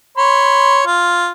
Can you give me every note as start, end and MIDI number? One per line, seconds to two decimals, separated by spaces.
0.17 0.85 73
0.17 0.85 83
0.17 0.85 84
0.86 1.30 65